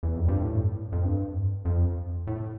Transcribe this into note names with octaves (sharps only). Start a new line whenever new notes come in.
E2
F2
G2
A2
F2
G2
F2
A2